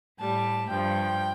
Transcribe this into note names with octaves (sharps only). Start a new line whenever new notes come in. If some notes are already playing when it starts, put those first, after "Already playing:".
A2 G3 A5
G2 F3 G5